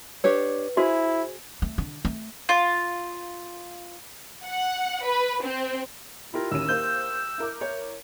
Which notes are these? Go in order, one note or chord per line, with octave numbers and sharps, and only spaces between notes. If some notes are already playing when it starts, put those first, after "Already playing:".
D4 G4 B4 C#5
E4 F#4 G#4 C5
A3
D3
A3
F4
F#5
B4
C4
E4 F4 G4 A#4
D#2 C#4 E6 D#7
A#3 C5 G6
E4 A#4 D6
C#5